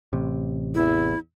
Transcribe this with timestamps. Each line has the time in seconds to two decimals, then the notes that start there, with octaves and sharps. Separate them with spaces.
0.13 A1 C3
0.75 E2 E4